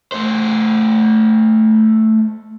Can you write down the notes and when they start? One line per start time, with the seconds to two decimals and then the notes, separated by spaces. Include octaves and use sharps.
0.12 A3 C5